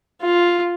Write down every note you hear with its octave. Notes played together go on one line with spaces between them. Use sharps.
F4